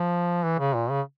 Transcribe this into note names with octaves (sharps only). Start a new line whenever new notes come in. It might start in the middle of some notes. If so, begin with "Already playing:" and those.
Already playing: F3
E3
C#3
A#2
C#3